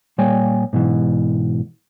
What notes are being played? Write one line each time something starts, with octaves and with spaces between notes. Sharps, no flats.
A#2 G3 C#5 G5 G#5
G#2 B2 D#3 E3